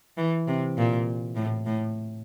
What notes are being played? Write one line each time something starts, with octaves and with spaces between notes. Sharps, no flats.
E3
C3
A#2
A2
A2